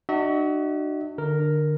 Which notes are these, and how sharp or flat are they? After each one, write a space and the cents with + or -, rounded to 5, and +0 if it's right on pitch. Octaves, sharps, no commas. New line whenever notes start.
D4 +45 F#4 +20 E5 -35
D3 +25 A#4 +0